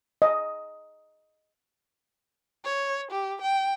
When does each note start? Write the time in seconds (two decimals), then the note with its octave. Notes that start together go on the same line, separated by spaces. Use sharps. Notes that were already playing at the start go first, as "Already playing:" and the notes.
0.22 D#5
2.65 C#5
3.11 G4
3.41 G5